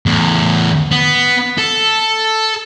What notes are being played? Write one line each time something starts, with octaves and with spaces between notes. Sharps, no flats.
E2 A2
B3
A4